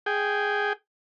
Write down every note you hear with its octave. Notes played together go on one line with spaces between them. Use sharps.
G#4 G5